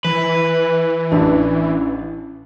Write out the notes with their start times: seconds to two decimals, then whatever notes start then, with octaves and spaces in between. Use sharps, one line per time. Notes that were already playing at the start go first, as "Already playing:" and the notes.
0.05 E3 B4
1.12 A1 C#4 D4 E4